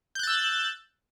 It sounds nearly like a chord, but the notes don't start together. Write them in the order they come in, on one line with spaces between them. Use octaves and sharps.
G6 F#6 A6 E6